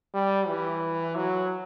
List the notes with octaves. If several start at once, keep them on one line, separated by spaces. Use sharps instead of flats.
G3
E3
F#3